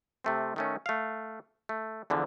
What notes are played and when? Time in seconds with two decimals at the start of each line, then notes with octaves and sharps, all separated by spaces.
0.24 C3 A3 C4
0.56 D#3 A3 C#4
0.86 A3 F5
1.69 A3
2.10 E2 D3 E3 F3